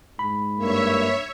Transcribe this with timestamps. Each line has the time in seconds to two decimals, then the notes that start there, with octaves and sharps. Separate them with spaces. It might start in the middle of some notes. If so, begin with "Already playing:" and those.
0.19 G#2 B5
0.58 G2 A#3 C#5 E5